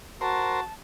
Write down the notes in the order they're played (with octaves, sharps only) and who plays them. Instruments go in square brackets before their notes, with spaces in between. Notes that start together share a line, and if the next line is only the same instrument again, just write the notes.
[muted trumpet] F#4 [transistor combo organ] A#4 C5 [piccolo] A5